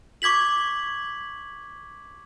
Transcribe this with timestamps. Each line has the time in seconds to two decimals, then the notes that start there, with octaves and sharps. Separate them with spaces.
0.22 C#6 D6 G#6 B6 F#7